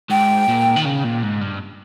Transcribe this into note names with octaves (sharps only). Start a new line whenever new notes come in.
G#2 G5
A#2
D#3
C#3
A#2
G#2
G2